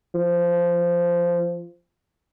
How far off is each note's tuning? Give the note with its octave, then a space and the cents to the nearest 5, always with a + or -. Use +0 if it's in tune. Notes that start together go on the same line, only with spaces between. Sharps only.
F3 -10